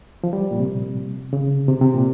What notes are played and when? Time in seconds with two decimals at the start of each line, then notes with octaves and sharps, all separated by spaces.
0.24 F3
0.33 G3
0.51 A#2
0.60 C3
1.33 C#3
1.68 C3
1.81 C3
1.94 A#2